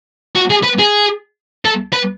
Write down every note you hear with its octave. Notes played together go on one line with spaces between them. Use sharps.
F#4
G#4
B4
G#4
A4
B4